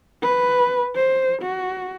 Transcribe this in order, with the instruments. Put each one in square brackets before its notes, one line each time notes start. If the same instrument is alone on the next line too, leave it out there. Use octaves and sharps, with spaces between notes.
[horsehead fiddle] B4
C5
F#4